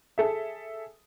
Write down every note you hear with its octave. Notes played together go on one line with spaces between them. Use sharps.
G#4 A4 E5